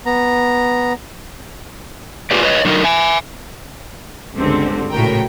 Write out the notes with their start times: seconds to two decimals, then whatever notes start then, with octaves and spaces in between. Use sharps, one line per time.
0.06 B3 A#5
2.31 F4 G4 G#4 B4 D5
2.43 B4 C#5 D#5
2.65 D3 F#3 D#4 A#4
2.84 E5 G#5
4.37 G1 C#2 D3 C4
4.90 A#1 A2 C#3 F#4 A#4 G5